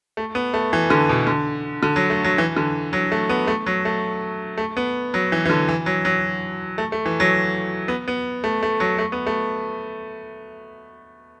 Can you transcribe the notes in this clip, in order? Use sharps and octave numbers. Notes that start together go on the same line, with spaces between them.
A3
B3
A3
E3
D3
B2
D3
D3
F#3
A3
F#3
E3
D3
F#3
A3
B3
A3
F#3
A3
A3
B3
F#3
E3
E3
D3
E3
F#3
F#3
A3
A3
E3
F#3
B3
B3
A3
A3
F#3
A3
B3
A3